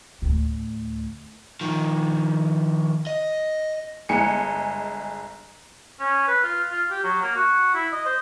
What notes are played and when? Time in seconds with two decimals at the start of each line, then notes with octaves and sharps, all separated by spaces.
0.22 D2 A2
1.61 D#3 F3
3.07 D#5
4.09 G1 G#3 G#5 C#7
6.00 C#4
6.27 B4
6.43 F4
6.71 F4
6.91 G4
7.04 F#3
7.22 A#3
7.35 F#4
7.74 E4
7.92 D#5
8.06 C5